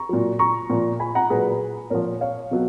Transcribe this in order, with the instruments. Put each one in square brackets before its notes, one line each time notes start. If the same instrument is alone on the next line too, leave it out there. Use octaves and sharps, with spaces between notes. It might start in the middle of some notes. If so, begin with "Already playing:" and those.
Already playing: [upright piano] A#5 C#6
A#2 F#3
A#5 C#6
A#2 F3
G#5 B5
F#5 A#5
A#2 F#3 G#4 B4
A#2 F3 A#4 C#5
C#5 F5
B2 F#3